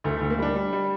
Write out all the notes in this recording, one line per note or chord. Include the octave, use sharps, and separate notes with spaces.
D2 A3
D2 A3
A#3
G3 D4
G3
G3